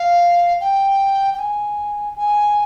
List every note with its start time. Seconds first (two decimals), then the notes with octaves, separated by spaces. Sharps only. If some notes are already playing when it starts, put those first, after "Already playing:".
Already playing: F5
0.61 G5
1.34 G5
1.39 G#5
2.16 G#5